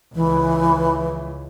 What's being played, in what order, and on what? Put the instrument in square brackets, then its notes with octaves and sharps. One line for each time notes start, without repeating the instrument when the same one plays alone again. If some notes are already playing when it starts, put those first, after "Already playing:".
[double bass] C#2 [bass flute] E3